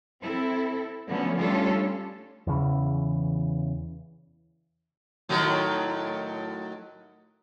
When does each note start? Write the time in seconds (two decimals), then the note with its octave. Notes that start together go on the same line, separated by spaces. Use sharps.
0.21 C4 E4 A4
1.07 D3 F3 F#3 A3 B3 C#4
1.40 G3 A3 C#4 D4 F4 A4
2.47 E2 C#3 E3
5.29 A2 D#3 F#3